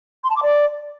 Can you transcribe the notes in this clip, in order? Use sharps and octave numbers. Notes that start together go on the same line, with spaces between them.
C6
A5
D6
D5